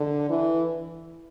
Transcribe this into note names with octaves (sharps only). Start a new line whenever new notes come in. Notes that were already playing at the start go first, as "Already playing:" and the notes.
Already playing: D3
E3